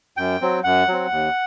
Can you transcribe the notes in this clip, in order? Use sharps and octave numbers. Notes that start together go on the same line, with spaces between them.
F#2 G5
F#3 C4
F#2 F#5
F#3 C4
D#2